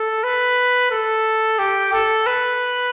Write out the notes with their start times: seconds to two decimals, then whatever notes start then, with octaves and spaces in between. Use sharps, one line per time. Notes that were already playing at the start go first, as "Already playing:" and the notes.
Already playing: A4
0.23 B4
0.91 A4
1.59 G4
1.93 A4
2.26 B4